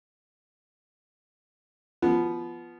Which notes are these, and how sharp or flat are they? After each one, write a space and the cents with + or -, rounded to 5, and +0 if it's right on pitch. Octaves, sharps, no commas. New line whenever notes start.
F3 -15 B3 +0